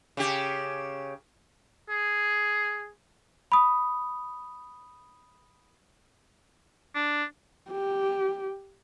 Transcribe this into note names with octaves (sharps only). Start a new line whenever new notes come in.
C#3 G4
G#4
B5 D#6
D4
G4